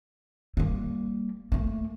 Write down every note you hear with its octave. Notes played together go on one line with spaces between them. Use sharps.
G3 A#3
A3 A#3